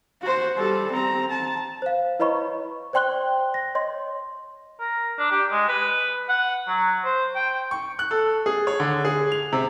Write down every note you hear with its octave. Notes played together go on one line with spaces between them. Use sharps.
F#4 C5
G3 A4
C4 A#5
A5
C5 F5
E4 B4 C#5 D#5 B5 C#6
C5 D5 G5 C6 F#6 G7
A#6
C#5 D#5 C6
A#4
D4
G4
G#3
B4
F#5
F#3
C5
G5
C#6
F#6
A4
G#4
C#5
D3
G#4
F7
C3